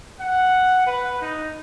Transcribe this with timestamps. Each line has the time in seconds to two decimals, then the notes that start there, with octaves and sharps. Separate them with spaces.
0.19 F#5
0.86 B4
1.21 D#4